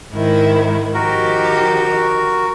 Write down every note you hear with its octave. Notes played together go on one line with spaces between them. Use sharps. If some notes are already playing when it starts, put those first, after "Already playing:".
G#2 D#3 E4
D#3 F3 F#4 G4 A#4